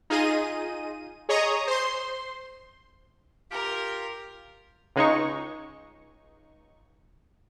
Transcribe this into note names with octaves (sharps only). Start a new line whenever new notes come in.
D#4 F4 G#4 D#5 D#7
G#4 C#5 D#5 A#5 C#6 D#6
C5 C6
F4 G4 A#4
C#2 G#3 D#4 C#6